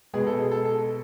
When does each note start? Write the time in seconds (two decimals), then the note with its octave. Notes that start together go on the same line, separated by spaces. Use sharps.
0.14 B2 G#3 B3 G#4
0.27 A4
0.39 G#4
0.52 A4
0.65 A4